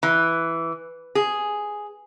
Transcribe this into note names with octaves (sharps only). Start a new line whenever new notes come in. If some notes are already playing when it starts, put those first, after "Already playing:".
E3
G#4